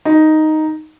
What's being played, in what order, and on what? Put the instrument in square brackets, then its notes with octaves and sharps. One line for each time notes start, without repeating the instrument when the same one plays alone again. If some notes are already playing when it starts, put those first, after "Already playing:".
[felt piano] D#4